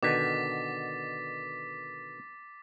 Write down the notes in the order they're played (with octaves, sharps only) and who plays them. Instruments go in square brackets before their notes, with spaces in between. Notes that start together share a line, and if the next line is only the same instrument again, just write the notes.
[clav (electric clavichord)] B2 D3 D#3 [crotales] D6 A6 B6